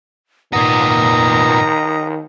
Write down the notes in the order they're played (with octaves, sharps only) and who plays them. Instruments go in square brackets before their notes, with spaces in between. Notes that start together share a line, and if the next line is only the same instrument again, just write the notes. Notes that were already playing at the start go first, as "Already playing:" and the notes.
[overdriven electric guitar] A#2 B3 [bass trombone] D#3 [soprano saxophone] A#5 [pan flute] D#6